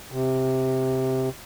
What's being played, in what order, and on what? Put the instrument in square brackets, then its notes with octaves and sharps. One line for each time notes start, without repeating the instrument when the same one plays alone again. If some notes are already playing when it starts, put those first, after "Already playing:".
[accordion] C3